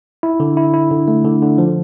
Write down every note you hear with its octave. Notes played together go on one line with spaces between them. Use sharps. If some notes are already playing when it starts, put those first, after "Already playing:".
E4
D3
E4
E4
D3
A3
D3
D3
F3